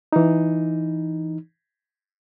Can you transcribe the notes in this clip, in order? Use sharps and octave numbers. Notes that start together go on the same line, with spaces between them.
E3 D#4